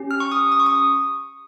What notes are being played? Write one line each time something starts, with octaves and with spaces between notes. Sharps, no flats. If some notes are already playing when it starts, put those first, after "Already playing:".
Already playing: C#4 G4
F6
C#6
D#6
D#6
C#6
D#6